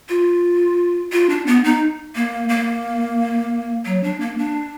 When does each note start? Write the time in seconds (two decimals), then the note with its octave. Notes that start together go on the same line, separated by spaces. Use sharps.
0.09 F4
1.12 F4
1.30 D4
1.47 B3
1.64 D#4
2.16 A#3
2.49 A#3
3.86 F#3
4.04 D4
4.20 A#3
4.38 D4